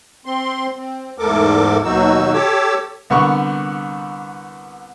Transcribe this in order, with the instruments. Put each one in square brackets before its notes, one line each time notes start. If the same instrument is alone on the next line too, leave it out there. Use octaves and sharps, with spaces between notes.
[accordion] C4 C6
C4
E2 G#2 A3 A4 A#4 D6
D#2 B2 F#3 D#4 F#4 E6
G4 A4 C#5 D6 E6
[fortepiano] C2 D3 B3 A#4 C#6